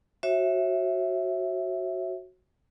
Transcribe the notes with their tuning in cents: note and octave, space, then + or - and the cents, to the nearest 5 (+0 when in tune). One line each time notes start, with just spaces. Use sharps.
F#4 +0 C#5 -40 E5 +0